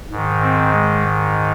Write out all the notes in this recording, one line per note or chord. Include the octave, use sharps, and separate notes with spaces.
G#2
D#3
C4
G#3